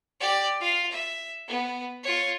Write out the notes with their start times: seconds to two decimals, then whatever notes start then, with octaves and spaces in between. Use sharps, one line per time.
0.20 G4 D5
0.61 F4 F5
0.91 E5
1.48 B3
2.03 F4 C#5